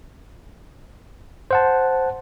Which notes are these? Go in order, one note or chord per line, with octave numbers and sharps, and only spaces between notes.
C5 F#5 A5